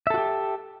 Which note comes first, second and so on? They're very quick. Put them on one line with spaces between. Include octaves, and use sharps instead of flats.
E5 A4 F#4 G4